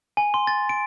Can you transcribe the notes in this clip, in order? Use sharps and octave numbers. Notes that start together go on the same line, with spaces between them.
G#5
C6
A6
D7